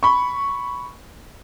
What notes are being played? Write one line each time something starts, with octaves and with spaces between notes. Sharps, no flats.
B5 C#6